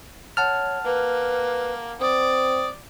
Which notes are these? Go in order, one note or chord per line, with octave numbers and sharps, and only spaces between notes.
C#5 F#5 A5 F6
A#3 B4
C4 D5 D#6